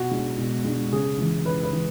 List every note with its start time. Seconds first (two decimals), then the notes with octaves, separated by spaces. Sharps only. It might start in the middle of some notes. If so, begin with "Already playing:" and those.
Already playing: B2 F#4
0.11 G#3 D4
0.38 B2
0.65 G#3 D4
0.92 C#3 G#4
1.18 E3 G#3
1.45 C#3 B4
1.63 B4
1.72 E3